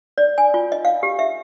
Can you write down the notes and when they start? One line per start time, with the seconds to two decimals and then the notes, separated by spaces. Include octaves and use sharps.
0.18 D5
0.38 G#5
0.54 F4
0.72 D#5
0.85 F5
1.03 G4
1.19 E5